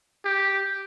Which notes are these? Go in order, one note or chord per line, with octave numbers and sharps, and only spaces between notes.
G4